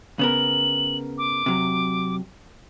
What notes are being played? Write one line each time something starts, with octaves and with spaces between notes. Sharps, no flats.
C#3 B3 A#4 F#7
D6
C3 F#3